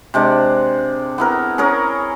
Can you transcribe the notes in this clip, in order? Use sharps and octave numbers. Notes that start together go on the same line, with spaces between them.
C3 G#3 D4
B3 E4 A#4
C#4 G#4 A#4 C#5